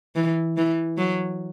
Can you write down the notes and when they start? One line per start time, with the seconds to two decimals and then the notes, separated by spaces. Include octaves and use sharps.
0.16 E3
0.57 E3
0.98 F#3